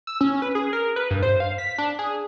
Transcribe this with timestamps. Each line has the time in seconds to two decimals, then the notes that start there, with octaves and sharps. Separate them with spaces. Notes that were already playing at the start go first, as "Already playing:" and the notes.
0.07 E6
0.21 C#4
0.42 B4
0.55 G#4
0.73 A#4
0.96 B4
1.10 G2
1.23 C5
1.40 F5
1.58 B6
1.78 D4
1.99 G#4